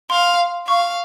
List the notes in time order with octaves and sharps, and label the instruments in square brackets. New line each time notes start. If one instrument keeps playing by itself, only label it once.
[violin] F5 [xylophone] C6
[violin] F5 [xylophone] C#6